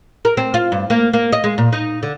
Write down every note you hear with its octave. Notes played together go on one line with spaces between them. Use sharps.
A#4
C4
F4
G2
A#3
A#3
D#5
G#3
A#2
D#4
D3